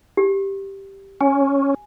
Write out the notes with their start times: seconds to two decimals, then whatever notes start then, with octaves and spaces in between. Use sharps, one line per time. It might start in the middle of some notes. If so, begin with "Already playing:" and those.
0.17 G4
1.21 C#4 G#5